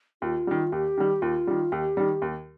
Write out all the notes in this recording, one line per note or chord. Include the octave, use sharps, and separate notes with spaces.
D#2 F4
D#3 G3
D#2 G4
D#3 G3
D#2 F4
D#3 G3
D#2 G4
D#3 G3
D#2